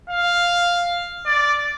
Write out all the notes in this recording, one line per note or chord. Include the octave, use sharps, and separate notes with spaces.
F5
D5